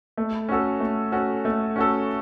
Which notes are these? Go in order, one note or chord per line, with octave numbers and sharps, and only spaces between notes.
A3
C#4 F#4 A4
A3
C#4 F#4 A4
A3
C#4 F#4 A4